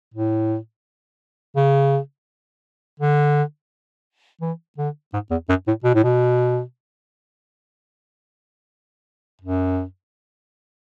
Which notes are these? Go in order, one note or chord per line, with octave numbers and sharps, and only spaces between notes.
A2
C#3
D3
E3
D3
G#2
E2
F#2
A2
B2
A2
B2
F#2